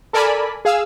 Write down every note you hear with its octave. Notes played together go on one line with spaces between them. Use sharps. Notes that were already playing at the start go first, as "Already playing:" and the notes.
A4 A#4 D5 G#5 A5 B5
G#4 F5 E6